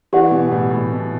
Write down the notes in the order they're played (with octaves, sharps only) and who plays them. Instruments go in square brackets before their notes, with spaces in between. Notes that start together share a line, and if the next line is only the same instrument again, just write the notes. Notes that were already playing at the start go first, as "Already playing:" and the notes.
[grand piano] E3 [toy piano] G4 D5 F#5
[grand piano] B2
A2
A2
B2